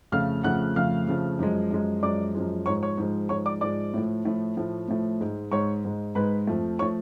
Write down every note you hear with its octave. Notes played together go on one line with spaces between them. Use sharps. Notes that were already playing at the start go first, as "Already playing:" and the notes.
F2 C#3 F3 A3 F5 F6
F2 C#3 F3 A3 F#5 F#6
F2 C#3 F3 A3 F5 F6
F2 C#3 F3 A3
F#2 F3 G#3
F#2 F3 G#3
F#2 F3 G#3 D5 D6
F#2 F3 G#3
G#2 F3 G#3 C#5 C#6
C#5 C#6
G#2 F3 G#3
G#2 F3 G#3 C#5 C#6
D5 D6
G#2 F3 G#3 D5 D6
A2 F3 A3
A2 F3 A3
A2 F3 A3
A2 F3 A3
G#2 G#3
G#2 G#3 C#5 C#6
G#2 G#3
G#2 G#3 B4 B5
F2 F3 A3
F3 A3 C#5 C#6